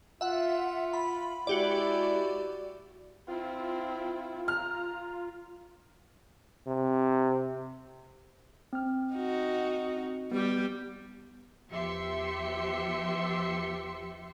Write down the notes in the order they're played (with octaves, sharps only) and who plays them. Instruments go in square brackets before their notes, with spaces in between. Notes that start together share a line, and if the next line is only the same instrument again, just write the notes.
[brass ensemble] F4 [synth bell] E5 F#5
[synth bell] B5
[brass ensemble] G#3 E4 [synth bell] F#4 G4 D5
[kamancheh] C4 E4 [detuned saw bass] F4
[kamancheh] A#5 [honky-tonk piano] F6
[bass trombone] C3
[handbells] C4 F6
[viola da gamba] D#4 F#4
[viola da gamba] G3 G4 [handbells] B3
[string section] E2 F3 G4 E5 C6 C#7